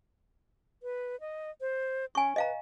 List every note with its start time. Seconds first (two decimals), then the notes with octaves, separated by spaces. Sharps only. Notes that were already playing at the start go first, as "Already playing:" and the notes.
0.83 B4
1.20 D#5
1.61 C5
2.15 C#4 G#5 C#6
2.36 B4 D#5 F5 A#5